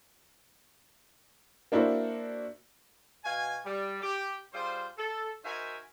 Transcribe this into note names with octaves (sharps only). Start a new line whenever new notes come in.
A#3 D4 E4 F#4 A#4 C5
B2 F#4 F5 G#5
G3
G4
G3 F4 G#4 C5
A4
D#4 F#4 A#4 C5 E5 G#5